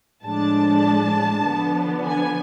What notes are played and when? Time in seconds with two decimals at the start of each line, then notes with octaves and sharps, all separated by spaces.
0.25 A2 F3 G#3 D4 A5
1.45 D3 F3 B3 D4
2.05 G#5